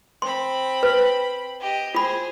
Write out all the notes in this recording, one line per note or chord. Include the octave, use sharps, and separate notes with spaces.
C4 B5 C6
B4
G4 D#5
F4 G#4 C5 B5